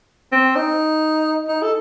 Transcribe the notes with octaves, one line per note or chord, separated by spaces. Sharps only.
C4
D#4
D#4
A4